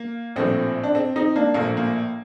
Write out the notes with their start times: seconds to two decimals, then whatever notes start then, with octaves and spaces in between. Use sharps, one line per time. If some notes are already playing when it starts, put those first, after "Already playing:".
Already playing: A#3
0.36 A#1 A2 F3 C4
0.83 D4
0.95 C4
1.16 C4 D#4
1.36 A#3 D4
1.54 A#1 A2 F3 A#3
1.77 A#3